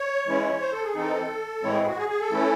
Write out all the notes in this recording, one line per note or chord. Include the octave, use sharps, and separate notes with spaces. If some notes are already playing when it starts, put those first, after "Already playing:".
Already playing: C#5
E3 G#3 C#4 E4
C5
A4
G#4
E3 C4 D#4 A4
A2 E3 G#3 C4 E4 C#5
G#4
F#4
G#4
G#4
A4
E3 A3 C#4 E4